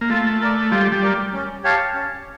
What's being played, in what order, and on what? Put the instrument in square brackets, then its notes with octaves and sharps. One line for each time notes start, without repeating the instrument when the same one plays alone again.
[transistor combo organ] A#3
[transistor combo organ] A3 [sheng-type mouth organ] F4
[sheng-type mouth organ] A#4 D5
[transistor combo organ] G3 [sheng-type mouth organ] F4
[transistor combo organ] G3
[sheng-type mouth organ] A#4 D5
C#4
G4 C#5 F5 A5
C#4